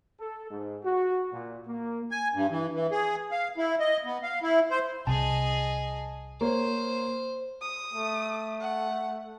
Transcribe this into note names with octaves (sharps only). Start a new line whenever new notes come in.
A4
G#2
F#4
A#2
A#3
G#5
G2
E3
E3
G#4
F5
E4
D#5
B3
F5
E4
C5
C2 C3 G#4 D#5 A5
A#3 A#4 C5 C#5
D#6
A3
F#5